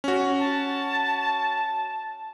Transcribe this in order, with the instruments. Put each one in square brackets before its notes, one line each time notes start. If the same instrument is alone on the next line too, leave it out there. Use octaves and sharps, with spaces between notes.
[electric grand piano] C#4 F#4
[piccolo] A5